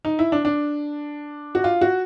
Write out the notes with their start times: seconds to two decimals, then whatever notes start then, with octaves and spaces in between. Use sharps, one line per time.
0.05 D#4
0.19 E4
0.32 D4
0.45 D4
1.55 F#4
1.64 F4
1.81 F#4